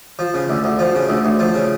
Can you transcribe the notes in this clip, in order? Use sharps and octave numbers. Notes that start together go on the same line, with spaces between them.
F3
C#3
D2
D2
F3
C#3
D2
D2
F3
C#3